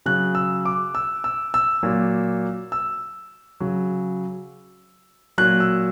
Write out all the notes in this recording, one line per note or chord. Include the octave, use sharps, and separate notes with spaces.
C#3 F#3 F#6
E6
D6
E6
E6
E6
A#2 F#3
E6
C#3 F#3
A#2 F#3 F#6
E6